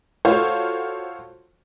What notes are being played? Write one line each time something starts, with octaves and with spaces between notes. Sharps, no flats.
F4 F#4 A4 C5 C#5 F5